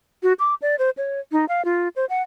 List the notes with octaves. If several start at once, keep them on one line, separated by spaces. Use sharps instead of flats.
F#4
D6
D5
C5
C#5
D#4
F5
F4
C5
F#5